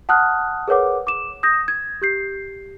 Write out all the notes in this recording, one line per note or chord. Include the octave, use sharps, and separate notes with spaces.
F#5 A5 D#6 F6 F#6
G#4 A#4 B4 C#5 F#5 D6
D6 E7
D#6 G6 A#6
G#6
G4 G6 C7